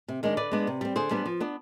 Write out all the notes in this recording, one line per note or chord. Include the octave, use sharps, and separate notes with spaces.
C3
D#3 G#3 D4
D3 B4 D5
G#3 B3 D4
C3
G3 C4
D3 G#4 C5
G3 B3 D4
F3
B3 D4